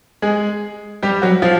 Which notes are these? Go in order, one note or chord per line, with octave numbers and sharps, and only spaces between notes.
G#3 G#4
G3 G4
F#3 F#4
F3 F4